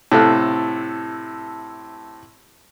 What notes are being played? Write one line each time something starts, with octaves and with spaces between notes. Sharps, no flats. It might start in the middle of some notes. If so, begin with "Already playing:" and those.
A2 C3 A4 F5 F#6